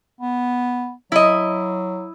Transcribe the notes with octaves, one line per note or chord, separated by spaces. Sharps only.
B3
F#3 E4 D#5